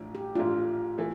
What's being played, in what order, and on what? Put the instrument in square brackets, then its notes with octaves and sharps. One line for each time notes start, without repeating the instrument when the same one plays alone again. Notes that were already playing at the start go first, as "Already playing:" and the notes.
Already playing: [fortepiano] A1 A2 F3 A3 D4
[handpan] G4
[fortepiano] A1 A2 F3 A3 D4 [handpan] F4
[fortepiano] A2 E3 A3